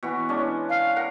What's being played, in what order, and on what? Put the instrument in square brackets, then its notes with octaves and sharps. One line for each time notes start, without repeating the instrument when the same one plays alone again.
[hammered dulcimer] B2 E3 B3
G#3 C#4 D4
[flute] F5
[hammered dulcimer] A#4 F#5 A#5